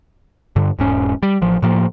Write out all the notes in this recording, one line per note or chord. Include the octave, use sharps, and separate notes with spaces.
G2 D3
E1 G#2 C#4
G3
A1 F3
A2 F3 A#3